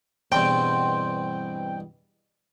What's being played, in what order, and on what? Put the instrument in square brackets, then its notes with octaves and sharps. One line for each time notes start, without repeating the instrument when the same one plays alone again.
[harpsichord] E2 G2 B2 [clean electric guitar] C4 [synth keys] G5